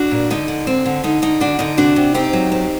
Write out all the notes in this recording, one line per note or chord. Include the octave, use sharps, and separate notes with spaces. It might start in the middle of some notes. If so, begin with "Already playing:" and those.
Already playing: D4 F#4
A#2
D3 D#4
D3
C4
D3
D3 D#4
D3 D#4
D3 D4 F#4
D3 D#4
C3 D4 F#4
C3
C4 D#4 G4
F#3
C4